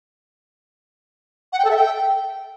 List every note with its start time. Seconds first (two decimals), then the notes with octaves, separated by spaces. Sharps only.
1.53 F#5
1.59 G5
1.65 A4
1.71 E5
1.77 G5